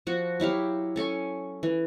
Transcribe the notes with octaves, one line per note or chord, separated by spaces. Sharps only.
F3 F#4
F#3 E4 G4 F5
C#4 A4 G#5 C#6
E3